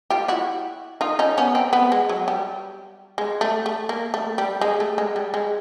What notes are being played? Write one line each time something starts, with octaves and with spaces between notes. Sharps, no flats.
F4 G4
E4 F#4
D#4 F4
C#4 D#4
B3 C#4
C4
B3
G#3
F#3
G3
G#3
A3
A3
A#3
A3
G3
G#3
A3
G#3
G3
G#3